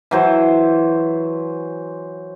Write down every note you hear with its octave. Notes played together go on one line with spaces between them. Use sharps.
E3 F#3 C5